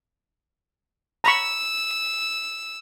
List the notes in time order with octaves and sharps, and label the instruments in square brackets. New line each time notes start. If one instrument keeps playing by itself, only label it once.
[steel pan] A#5 B5 C#6 [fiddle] E6